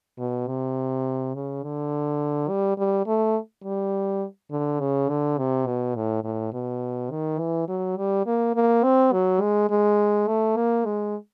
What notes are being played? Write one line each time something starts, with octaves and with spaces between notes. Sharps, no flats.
B2
C3
C#3
D3
G3
G3
A3
G3
D3
C#3
D3
C3
B2
A2
A2
B2
D#3
E3
F#3
G3
A#3
A#3
C4
F#3
G#3
G#3
A3
A#3
G#3